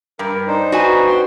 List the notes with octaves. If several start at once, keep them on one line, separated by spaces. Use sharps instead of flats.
G2 A#4
D4 D#4 C5
F#4 B4 G#5
C5 G5 C6